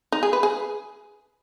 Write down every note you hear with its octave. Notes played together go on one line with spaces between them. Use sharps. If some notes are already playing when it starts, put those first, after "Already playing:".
D#4
G#4
B4
G#4